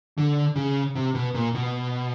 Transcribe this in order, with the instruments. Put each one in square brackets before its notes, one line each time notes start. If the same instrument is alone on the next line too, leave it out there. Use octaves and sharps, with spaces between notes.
[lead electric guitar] D3
C#3
C3
B2
A#2
B2